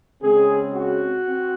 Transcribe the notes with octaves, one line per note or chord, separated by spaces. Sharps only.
C#3 G#3 C4 G#4
F#4
C4